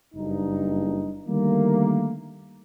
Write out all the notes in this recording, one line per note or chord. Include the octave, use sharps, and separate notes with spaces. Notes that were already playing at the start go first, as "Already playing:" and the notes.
F#1 G2 D#4
D3 D#3 G3 A3 A#3